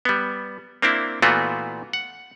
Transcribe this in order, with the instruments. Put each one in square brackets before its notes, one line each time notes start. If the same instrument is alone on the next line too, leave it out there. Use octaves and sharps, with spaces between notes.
[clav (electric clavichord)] G3 B3
A#3 C4 D4 E4
A#2 E3 A3 B3 F4 F#4
F#5